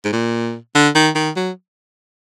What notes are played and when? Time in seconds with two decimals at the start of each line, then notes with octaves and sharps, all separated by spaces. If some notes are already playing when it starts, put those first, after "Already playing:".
0.05 G#2
0.13 A#2
0.75 D3
0.95 D#3
1.16 D#3
1.36 F#3